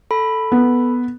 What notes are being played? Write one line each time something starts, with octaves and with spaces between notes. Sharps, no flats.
A4 B5
B3